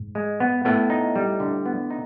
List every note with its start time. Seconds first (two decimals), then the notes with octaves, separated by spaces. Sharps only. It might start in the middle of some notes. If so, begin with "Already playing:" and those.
Already playing: G#2
0.15 G#3
0.40 B3
0.65 A2 B3
0.90 D#4
1.16 G3
1.40 D3
1.66 B3
1.90 D#4